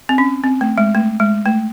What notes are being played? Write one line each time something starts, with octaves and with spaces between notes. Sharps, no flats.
C4
C#4
C4
A3
G#3
A3
G#3
A3